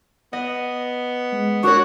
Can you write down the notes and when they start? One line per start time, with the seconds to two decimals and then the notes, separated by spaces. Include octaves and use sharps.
0.33 B3 D#5
1.32 G#3
1.63 D4 F#4 A#4 C#5 C#6